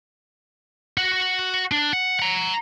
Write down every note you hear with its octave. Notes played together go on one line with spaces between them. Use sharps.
F#4 F#5
D4
F#5
F#5 A#5